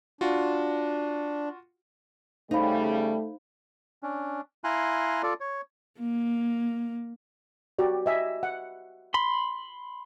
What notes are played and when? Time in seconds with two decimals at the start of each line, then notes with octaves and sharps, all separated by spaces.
0.21 D4 F4 F#4
2.51 C#3 G3 A3 D#4 C5 F5 B5
4.03 C#4 D4
4.64 E4 F5 G#5 A#5 C6 F#6
5.23 F4 A4 D5
5.40 C#5
5.99 A#3
7.79 F#4 G4 D5
8.06 D#5 E5 G#5
8.43 F#5
9.14 B5 C6